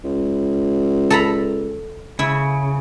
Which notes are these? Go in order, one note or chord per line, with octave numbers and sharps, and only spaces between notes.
C#2
A4 A#5 B5
C#3 E4